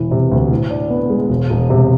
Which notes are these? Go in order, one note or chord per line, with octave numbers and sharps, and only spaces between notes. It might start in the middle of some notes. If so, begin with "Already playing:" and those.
Already playing: E1 E3
C3
D2
A2
D4
B3
G#3
E1
E1
C3